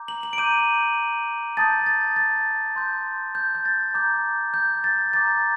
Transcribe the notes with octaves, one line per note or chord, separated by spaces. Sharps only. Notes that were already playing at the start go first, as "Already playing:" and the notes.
Already playing: A#5 D6 G6
F#7
F#7
D7
A#5 D6 G6 D#7
A5 D#6 G6 A6
A6
A6
C6 G6
G6
G6
A6
A#5 D6 G6
G6
A6
A#5 D6 G6 A6